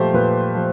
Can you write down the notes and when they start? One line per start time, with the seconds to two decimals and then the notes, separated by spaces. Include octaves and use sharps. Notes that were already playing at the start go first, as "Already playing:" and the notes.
Already playing: A#2 F3 A3 G4 C5
0.14 A#2 B4
0.55 F3